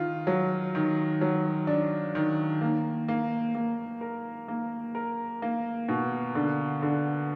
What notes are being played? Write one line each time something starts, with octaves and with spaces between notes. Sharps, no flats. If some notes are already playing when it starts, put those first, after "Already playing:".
Already playing: D#3 F4
F#3
D#3
F#3
D4
D#3
A#3
A#3
A#3
A#4
A#3
A#4
A#3
B2
D3
D3